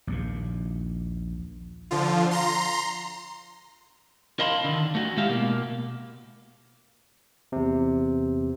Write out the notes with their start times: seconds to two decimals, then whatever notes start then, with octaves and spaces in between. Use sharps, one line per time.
0.07 A#1 D#2 A#2
1.91 D3 F3 F4
2.31 A#5 C6
4.39 A#4 D#5 F5 A5 B5 C6
4.64 D3 D#3
4.95 A3 F#4
5.17 A2 G#3 G4 E5 F5
5.29 B2 A#3
7.52 E2 C3